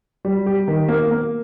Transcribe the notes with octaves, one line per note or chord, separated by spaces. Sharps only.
G3
G4
D#3
A#3
A#3